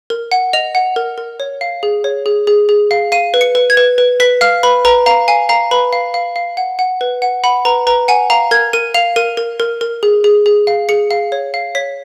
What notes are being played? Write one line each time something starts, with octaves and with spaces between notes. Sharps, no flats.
A#4
F#5
D#5 F7
F#5
A#4
A#4
C#5
F5
G#4
C#5
G#4
G#4
G#4
F5
F5 D#7
B4
C#7
B4
G#6
B4
B4
B4 B6
F5 F6
B4 B5
B4 A#5
F5 A#5
F5 G#5
F5 A#5
B4 B5
F5
F5
F5
F#5
F#5
B4
F#5
F#5 B5
B4 A#5
B4 A#5
F#5 G#5
F5 A#5
A#4 G#6
A#4 D#7
F5 F7
A#4 D#7
A#4
A#4
A#4
G#4
G#4
G#4
F5
G#4 C#7
F5
C#5
F5
C#5 B6